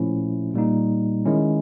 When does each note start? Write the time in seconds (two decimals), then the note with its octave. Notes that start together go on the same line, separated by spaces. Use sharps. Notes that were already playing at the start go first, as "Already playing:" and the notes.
Already playing: A#2 F3 A3 C#4 E4
0.54 A#2 G3 A#3 D#4
1.25 D#3 G#3 C#4 E4